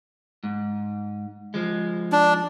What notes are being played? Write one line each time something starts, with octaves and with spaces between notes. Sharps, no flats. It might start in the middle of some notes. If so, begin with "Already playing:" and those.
G#2
F3 G#3
D4